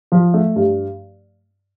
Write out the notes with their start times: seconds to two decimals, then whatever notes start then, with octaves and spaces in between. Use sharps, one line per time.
0.12 F3
0.34 A3
0.56 G2